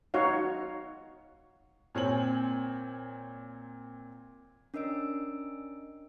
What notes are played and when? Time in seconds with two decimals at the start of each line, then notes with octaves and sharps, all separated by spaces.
0.14 D#4 F#4 C#5 F5
1.95 A#2 C4 C#5 G#5 F#7
4.74 C#4 D4 A#4 D#5 E6 D7